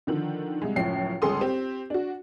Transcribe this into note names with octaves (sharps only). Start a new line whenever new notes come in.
D3 D#3 F3
C2 G#3
C#2 F#2 A2 F3 C7
G1 C#2 G#4 A4 C6 D#6
C4 G4
D4 F#4